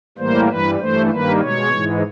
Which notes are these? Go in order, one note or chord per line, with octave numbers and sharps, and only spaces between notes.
A2 E3 G3 A#3 C5
G2 E3 G3 B4
G2 E3 A3 C5
G2 D#3 G3 A#3 B4
B2 G#3 C#5
G#2 E3 G#3